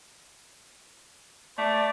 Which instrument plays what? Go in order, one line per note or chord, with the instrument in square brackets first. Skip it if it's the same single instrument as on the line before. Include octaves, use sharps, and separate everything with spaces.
[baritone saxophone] A3 [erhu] D5